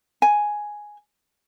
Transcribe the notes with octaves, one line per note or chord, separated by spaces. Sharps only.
G#5